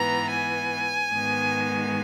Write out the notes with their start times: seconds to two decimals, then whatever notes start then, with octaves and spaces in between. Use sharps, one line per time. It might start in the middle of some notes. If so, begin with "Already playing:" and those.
Already playing: G#2 E3 B3 A#5
0.29 G#5
1.12 G#2 D#3 G#3 B3